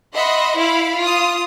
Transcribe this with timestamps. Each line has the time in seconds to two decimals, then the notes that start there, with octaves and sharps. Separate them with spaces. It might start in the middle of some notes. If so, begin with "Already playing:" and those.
0.15 D#5 E5 F#5 B5 C6
0.59 E4 F5 B5
0.98 F4 D#6